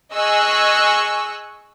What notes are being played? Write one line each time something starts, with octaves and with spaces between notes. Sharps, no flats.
G#4 D#5 G#5 C#6 E6 F#6